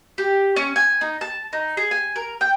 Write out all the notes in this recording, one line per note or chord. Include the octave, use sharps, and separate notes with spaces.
G4
C#4
G#5
D#4
A5
D#4
G#4
G#5
A#4
G5